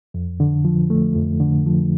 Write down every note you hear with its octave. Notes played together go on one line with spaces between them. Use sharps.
F2
D3
F3
A3
F2
D3
F3